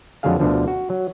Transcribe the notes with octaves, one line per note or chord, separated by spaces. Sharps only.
F2 D3 F#3 G#3 G#4 F5
D2 B2 D3 F3
F#4
F#3